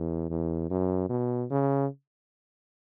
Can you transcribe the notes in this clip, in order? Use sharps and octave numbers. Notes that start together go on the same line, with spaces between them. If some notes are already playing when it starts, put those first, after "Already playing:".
Already playing: E2
E2
F#2
B2
C#3